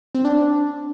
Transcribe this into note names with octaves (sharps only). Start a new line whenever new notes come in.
C4
D4